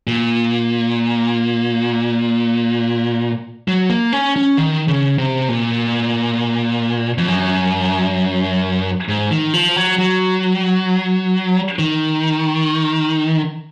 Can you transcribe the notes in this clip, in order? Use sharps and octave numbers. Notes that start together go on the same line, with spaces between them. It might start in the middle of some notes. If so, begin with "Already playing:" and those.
A#2
F#3
A#3
C#4
C#4
D#3
C#3
C3
A#2
F2
F#2
G#2
D#3
F3
F#3
F#3
D#3